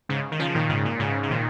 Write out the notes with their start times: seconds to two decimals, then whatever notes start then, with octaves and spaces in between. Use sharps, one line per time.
0.09 G#2 C#3
0.32 D#3
0.39 C#3 F3
0.50 F3
0.55 A#2 D#3
0.69 G#2 C#3
0.85 A#2
0.99 G#2 C#3
1.23 C#3
1.30 A#2 D#3